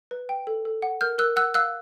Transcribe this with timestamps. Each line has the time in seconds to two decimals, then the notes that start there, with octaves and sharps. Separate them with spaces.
0.11 B4
0.29 G5
0.47 A4
0.65 A4
0.82 F#5
1.01 A#4 F6 G6
1.18 A#4 E6 F#6
1.36 F#5 E6 F#6
1.54 F5 E6 F#6